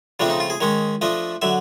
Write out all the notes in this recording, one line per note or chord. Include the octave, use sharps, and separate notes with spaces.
C#3 F3 A3 C4 D4
D#4
F4
G#4
D#3 G#3 C#4 C#5
F3 A3 D4 D#5
D3 F#3 E5